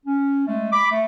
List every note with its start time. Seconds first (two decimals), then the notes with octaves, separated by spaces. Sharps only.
0.06 C#4
0.47 G#3 A3
0.73 B5 D6
0.90 A3